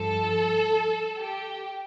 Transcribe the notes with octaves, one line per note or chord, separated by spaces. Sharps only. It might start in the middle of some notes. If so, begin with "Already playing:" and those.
Already playing: G2 F3 A4
G4